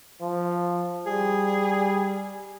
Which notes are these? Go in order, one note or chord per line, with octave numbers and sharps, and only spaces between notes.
F3
G3 G#4